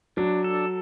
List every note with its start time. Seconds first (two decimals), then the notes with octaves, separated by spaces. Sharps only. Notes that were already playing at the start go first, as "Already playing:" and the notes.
0.17 F#3 D4
0.44 A4